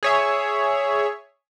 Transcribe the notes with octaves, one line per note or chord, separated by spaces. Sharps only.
G#4 C#5 E5